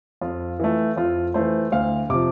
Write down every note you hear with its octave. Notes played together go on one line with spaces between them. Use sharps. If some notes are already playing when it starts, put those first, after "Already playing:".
F2 F4
E3 A3
F2 F4
E3 A3 C5
D2 F5
C3 F3 D6